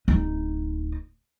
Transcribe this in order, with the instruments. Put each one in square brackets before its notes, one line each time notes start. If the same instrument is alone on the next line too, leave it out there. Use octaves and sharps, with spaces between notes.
[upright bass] D1 D#4